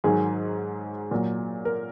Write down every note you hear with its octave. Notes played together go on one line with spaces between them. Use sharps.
G#2 D#3 F#3 G#4
A#2 F#3
A#4